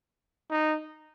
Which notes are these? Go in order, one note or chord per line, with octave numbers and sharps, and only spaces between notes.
D#4